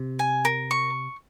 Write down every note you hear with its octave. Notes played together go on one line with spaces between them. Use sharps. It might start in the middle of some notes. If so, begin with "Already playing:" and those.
Already playing: C3
G#5
A#4
C#6